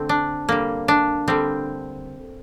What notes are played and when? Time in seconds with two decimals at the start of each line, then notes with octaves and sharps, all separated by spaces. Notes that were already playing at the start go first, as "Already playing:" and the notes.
Already playing: D3 A3 C4
0.09 D4
0.49 D3 G3 A#3
0.88 D4
1.28 D3 G3 C4